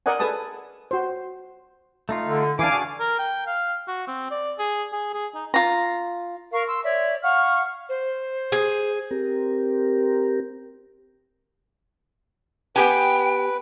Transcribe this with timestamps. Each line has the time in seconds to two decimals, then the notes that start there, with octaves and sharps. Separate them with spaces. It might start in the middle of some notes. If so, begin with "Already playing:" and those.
0.06 A#4 D5 D#5 F#5 G#5
0.19 G#4 A4 B4 G#5 A5 D#6
0.91 F#4 C5
2.09 A3 D#4 F4
2.27 D3
2.59 E3 D4 F5 G#5 D6
2.72 D4 F#4 G#4
3.00 A#4
3.19 G5
3.47 F5
3.88 F#4
4.08 C4
4.31 D5
4.59 G#4
4.92 G#4
5.14 G#4
5.35 D#4
5.54 F4 A#5
6.52 A#4 F5 C#6
6.67 C6 E6
6.83 C#5 D5 E5
7.22 F5 F#5 C#6 F6
7.89 C5
8.52 G#4
9.11 C4 G4 A#4
12.76 B3 G4 B4 G5 G#5